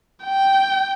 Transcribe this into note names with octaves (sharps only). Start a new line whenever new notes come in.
G5